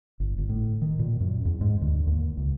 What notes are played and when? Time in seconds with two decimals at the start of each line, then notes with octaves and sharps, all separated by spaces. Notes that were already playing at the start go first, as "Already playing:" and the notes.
0.20 G1
0.38 G1
0.49 A2
0.82 D#3
0.99 A#2
1.20 F#2
1.45 E2
1.61 G#2
1.81 D2
2.07 D#2
2.37 C#2